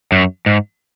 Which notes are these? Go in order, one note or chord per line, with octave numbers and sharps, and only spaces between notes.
F#2
G#2